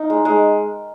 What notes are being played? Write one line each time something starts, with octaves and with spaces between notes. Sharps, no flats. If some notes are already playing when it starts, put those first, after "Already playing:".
Already playing: D#4 A#4
G#3
G#3